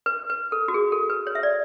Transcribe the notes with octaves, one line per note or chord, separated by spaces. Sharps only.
B4
B4
A4
F#4
G#4
A4
B4
C#5
E5
D5